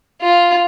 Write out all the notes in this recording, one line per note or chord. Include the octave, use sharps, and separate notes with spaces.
F4